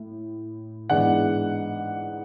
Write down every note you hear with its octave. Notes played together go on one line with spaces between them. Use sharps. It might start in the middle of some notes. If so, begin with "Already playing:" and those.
Already playing: A2
G#2 E3 G#3 B3 D4 F#5